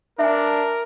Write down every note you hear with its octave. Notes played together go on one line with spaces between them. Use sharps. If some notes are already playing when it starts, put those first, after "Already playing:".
D4 A#4 E5 G#5